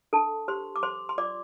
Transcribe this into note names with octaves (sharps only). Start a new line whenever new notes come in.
D4 A4 A5
G4 C5 C6
D6
C5 C6
C6
F4 D5 D6